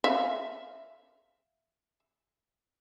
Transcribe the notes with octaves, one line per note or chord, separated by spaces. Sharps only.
E5 F5